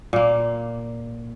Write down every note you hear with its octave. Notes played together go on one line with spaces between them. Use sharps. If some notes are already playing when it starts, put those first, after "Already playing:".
A#2 A#3